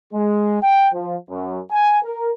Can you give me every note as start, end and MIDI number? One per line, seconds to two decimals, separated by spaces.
0.13 0.58 56
0.62 0.88 79
0.93 1.15 53
1.30 1.59 42
1.71 1.98 80
2.03 2.31 70